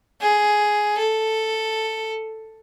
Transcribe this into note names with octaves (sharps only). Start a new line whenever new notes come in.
G#4
A4